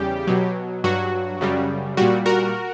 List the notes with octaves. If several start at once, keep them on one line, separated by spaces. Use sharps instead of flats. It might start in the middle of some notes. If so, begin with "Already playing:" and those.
Already playing: E2 C#3 G3 G4
B2 F#3
G2 F#3 F#4
F#2 C#3 G3
A#2 G3 F#4
F#4 A#4